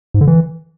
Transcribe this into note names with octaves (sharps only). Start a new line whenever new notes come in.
G#2
D3
E3